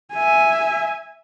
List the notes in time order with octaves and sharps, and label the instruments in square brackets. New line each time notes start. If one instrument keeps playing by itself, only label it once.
[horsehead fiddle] E5 G#5